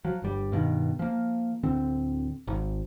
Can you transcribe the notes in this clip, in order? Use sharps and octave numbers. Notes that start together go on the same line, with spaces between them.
F3 F#3
G1 G3
G2 B2 D#3
F3 A#3
D1 D3 C4
G#1